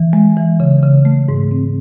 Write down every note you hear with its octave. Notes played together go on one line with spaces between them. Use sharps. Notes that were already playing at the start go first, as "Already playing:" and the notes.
Already playing: E3
G#3
E3
C#3
C#3
A3
G#2
C4